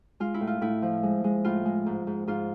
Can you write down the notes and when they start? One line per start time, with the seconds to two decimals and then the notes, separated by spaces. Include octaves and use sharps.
0.20 G#3 F4
0.34 E4
0.41 A2
0.47 F4
0.61 A2 E4
0.82 F3
1.03 G#3
1.24 G#3
1.45 A2 F4
1.65 G#3
1.86 G#2
2.07 G#2
2.27 G#2 F4